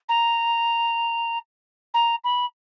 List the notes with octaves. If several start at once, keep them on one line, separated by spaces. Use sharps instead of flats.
A#5
A#5
B5